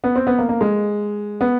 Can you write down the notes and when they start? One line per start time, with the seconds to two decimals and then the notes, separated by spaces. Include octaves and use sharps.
0.04 B3
0.16 C4
0.27 B3
0.39 A#3
0.49 A#3
0.61 G#3
1.41 B3